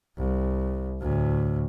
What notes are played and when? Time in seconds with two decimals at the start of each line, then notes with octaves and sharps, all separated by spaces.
0.17 C2
1.01 D2 A2